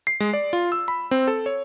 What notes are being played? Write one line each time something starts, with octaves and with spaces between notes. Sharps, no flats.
C7
G#3
D5
F4
E6
B5
C4
A4
C#5